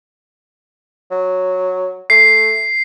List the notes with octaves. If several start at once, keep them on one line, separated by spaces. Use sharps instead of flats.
F#3
A3 C7